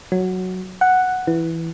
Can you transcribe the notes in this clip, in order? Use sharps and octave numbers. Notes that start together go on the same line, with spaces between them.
F#3
F#5
E3